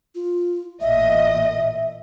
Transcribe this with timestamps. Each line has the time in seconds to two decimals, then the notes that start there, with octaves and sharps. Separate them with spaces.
0.15 F4
0.81 A1 A#2 D#5 E5